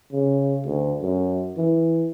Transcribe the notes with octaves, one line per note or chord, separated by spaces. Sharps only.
C#3
D2
F#2
E3